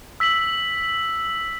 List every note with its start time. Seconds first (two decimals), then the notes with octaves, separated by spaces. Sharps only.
0.20 E6 B6 F#7